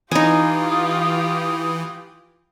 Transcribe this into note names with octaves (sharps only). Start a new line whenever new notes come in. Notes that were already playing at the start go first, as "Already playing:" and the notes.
E3 D#4 F4 G4 G#5 D#6